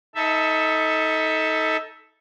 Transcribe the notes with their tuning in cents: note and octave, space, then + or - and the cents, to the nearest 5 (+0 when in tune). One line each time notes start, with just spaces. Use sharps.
D#4 +25 A4 +0 E5 +5